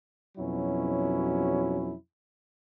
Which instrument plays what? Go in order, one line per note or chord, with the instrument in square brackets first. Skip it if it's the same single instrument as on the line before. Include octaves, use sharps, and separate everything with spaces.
[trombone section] F2 B2 F#3 C#4 E4